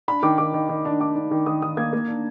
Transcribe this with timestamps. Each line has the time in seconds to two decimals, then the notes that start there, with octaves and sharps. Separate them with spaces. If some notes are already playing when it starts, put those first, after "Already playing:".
0.08 D4 B5
0.23 D#3 D6
0.38 D#3 D6
0.54 D#3
0.69 D#3
0.85 D4
1.00 D4 D6
1.15 D4
1.31 D#3
1.46 D#3 D#6
1.62 D#3 D#6
1.77 A#3 G#6
1.93 A#3
2.08 D4